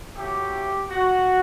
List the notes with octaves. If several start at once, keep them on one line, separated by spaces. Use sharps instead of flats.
A2 F#3 A3 G4
F#4